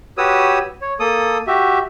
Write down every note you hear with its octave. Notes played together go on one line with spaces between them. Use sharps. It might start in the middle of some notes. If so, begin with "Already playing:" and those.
F#4 G4 B4 C#5 D#6 E6
C#5
A#3 A4 D#6
F#4 G4 E5